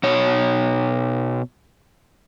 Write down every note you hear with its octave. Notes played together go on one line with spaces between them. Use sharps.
B2 C#5